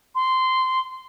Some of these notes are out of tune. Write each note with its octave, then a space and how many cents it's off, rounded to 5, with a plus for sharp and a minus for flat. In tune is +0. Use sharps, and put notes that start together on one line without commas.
C6 -15